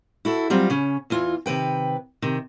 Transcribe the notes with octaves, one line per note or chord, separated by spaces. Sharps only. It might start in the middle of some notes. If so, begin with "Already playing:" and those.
E4 F#4 A4
F#3 G3 C4 F4
C#3 C#4
E2 E3 F4
C3 D#3 B4 G5
C3 D#3